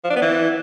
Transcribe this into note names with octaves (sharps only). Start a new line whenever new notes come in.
F3
D4
B3
E3